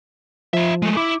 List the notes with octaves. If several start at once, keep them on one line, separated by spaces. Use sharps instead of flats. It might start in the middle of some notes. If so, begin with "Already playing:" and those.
F3 F4 E5
G#3 A3
E4 D6